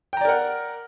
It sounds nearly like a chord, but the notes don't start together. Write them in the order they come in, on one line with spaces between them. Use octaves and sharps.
G5 A#5 D5 A#4 F#5